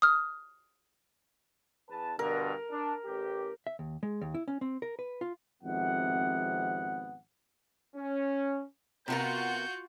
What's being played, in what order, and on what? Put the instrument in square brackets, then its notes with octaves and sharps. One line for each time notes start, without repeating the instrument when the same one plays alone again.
[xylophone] D#6 F6
[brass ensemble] E2 B4 A5
[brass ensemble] G2 B2 D3 [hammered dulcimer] A#4
[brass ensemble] D4
A1 G4
[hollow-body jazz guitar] E5
D#2
G#3
D#2
E4
C#4
C4
A#4
B4
F4
[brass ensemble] G#1 F2 C3 B3 F#5
C#4
[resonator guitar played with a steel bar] C3 B3 A#4 [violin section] F4 F#4 C#7 [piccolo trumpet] G6